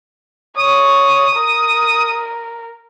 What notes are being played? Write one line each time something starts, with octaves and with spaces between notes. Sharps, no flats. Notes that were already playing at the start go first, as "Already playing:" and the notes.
C#5 D#6
A#4